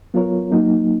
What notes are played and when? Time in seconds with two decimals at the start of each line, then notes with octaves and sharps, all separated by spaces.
0.14 F#3 B3 F4 A#4 C#5
0.52 F#3 A#3 D#4